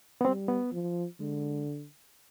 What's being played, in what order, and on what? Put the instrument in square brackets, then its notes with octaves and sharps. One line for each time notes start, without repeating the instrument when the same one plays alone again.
[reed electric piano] B3
[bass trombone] G3 [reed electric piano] C4
[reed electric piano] B3
[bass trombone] F3
[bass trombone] D3 [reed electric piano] G#3